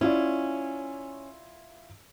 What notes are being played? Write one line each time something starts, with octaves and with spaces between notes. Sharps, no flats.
C#4 E4 F4 D5